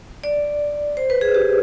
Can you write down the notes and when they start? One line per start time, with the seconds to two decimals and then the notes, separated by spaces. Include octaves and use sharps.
0.24 D5
0.97 C5
1.10 B4
1.21 G#4
1.34 G4